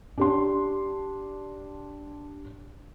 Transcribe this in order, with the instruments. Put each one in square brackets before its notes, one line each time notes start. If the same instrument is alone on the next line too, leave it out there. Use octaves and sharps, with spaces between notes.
[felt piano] D4 G4 C6